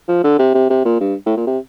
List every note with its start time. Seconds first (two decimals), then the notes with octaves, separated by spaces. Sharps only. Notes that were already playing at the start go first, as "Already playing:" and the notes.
0.08 F3
0.24 D3
0.39 C3
0.54 C3
0.70 C3
0.85 A#2
1.00 G2
1.26 A2
1.37 A#2
1.47 C3